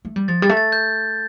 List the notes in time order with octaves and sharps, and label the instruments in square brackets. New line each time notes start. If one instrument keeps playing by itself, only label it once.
[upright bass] A3
G3
[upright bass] F3 [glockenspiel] A6
[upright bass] G3 [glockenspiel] A6
[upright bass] A3
[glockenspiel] A6
G6